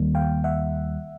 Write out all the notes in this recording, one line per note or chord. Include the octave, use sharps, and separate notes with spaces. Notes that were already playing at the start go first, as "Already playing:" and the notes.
Already playing: D#2 D#3 G3 A#3
F5 G5
E5 F#5